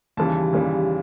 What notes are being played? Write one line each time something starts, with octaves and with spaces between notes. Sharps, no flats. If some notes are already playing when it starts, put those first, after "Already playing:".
D#2 C#3 E3 G3 A5
D#2 C#3 E3 G3